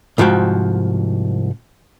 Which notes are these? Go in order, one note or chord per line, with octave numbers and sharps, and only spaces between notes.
C2 G#2 F3 F#4 G5